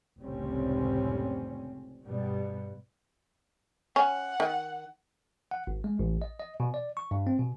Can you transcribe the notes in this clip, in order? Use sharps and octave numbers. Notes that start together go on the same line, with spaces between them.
F1 C#2 A2 G3 C4 C#4
G2 B2 G3 B3
C#4 F#5
D#3
F#5
G#1
G#3
A1
D#5
D#5
B2
D5
C#6
G2
C4
B2